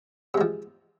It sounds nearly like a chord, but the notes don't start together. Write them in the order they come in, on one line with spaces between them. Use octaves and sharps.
C3 G#3 F3